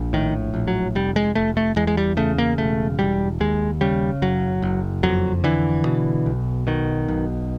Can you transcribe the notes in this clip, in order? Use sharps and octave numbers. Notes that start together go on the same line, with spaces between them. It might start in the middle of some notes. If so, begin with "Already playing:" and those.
Already playing: A#1
A2 D#3
A#1
F#3
F1 G3
G#3
F1 A3
A3
E2 G#3
G#3
G3
C#3 A3
A#3
E1 A3
E1 G3
D#2 G#3
C#3 G3
F#1 F#3
F#1
F2 F#3
D3 E3
B2
B1
B2 D#3
B1